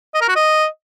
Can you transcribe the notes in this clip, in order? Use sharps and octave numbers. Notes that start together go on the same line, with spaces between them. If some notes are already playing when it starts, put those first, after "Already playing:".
D#5
A#4
F#4
D#5